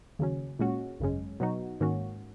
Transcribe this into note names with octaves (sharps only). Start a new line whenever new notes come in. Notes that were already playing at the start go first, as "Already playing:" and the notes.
D#2 C#3 F#3 C#4
A#2 G#3 C#4 F#4
G#1 F#2 C#3 G#3 C#4
B2 F#3 B3 D#4 F#4
G#2 D#3 A#3 C#4 F#4